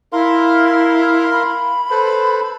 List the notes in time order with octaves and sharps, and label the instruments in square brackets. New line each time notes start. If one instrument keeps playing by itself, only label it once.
[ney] E4 [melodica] A#4 F5 C6
[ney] B5
[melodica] A4 B4 C5